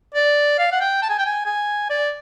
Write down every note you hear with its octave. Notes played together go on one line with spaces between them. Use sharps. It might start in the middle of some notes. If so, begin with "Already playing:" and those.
D5
F5
F#5
G5
A5
G#5
G5
G#5
G#5
D5